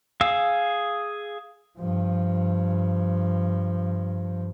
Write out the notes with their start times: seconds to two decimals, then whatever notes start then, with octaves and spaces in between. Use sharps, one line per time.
0.21 G#4 F5 E6
1.79 G2 F3